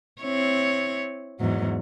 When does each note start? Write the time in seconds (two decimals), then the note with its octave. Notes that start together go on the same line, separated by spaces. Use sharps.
0.22 C4 E4 C#5
1.40 E2 G#2 F#3